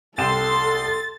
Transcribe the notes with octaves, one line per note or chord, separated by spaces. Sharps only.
C2 A4 G5 C6 A6 E7